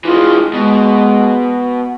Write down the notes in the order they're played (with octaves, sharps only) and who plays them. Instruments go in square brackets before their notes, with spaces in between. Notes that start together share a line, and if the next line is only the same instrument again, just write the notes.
[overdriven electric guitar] E3 G#3 [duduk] F4
[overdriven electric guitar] B2 [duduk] G#3